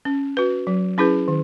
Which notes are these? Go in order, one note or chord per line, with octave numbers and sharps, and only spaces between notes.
C#4
F#4 B4
F#3
C#4 E4 G#4 B4
D#3